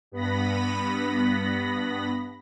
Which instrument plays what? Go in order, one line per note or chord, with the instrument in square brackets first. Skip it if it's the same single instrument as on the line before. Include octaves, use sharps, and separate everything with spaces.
[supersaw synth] G2 B3 B5 A#6